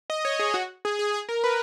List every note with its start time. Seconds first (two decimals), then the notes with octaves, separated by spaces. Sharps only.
0.10 D#5
0.25 C#5
0.39 G#4
0.54 F#4
0.85 G#4
0.99 G#4
1.14 G#4
1.29 A#4
1.44 B4